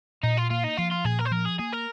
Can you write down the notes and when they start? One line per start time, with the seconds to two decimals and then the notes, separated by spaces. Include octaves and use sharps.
0.23 A#2 D#4
0.38 F4
0.51 A#3 F4
0.64 D#4
0.78 F3 F4
0.91 F4
1.05 A#2 G#4
1.19 A#4
1.25 C5
1.31 F3 A#4
1.45 G#4
1.59 A#3 G#4
1.72 A#4